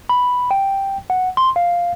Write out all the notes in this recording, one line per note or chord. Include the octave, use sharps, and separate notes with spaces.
B5
G5
F#5
C6
F5